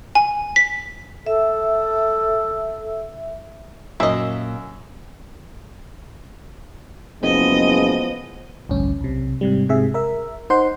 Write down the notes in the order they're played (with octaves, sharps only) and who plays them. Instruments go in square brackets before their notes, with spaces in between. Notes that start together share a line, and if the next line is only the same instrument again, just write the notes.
[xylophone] G#5
B6
[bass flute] A4 [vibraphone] E5
[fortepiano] F#2 E5 [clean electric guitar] A#2 [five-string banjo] A#3 D#5
[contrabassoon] F#1 [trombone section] E3 F3 G#3 [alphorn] B3 [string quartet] D#5
[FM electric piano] A1 D2 G2 C#4
B1 C3
G#2 C3 G3
G#2 C3 G#4 E5
A#4 E5
D#4 C5 F#5 C6